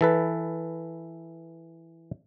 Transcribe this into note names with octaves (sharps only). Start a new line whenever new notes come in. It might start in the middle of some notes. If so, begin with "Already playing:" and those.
E3 A4 B4